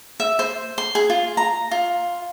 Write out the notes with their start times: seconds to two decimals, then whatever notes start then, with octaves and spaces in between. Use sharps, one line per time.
0.20 E5
0.39 C5
0.78 C6
0.95 G#4
1.10 F4
1.37 A#5
1.71 F4